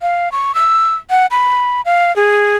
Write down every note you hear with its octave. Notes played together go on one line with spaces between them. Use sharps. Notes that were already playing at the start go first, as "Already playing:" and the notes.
F5
C#6
E6
F#5
B5
F5
G#4